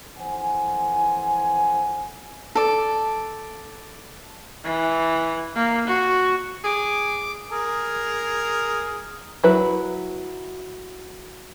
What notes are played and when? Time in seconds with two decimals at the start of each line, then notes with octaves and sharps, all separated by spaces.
0.18 F2 E3 C5 F#5 G#5
2.55 A4 D5
4.64 E3
5.55 A#3
5.87 F#4
6.64 G#4 D6
7.51 G#4 A#4
9.44 F#3 E4 B4